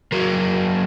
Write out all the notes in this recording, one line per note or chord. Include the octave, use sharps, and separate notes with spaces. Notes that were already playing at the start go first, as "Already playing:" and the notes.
F#3 A#3